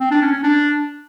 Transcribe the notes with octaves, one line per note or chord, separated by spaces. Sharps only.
C4
D4
C#4
C#4
D4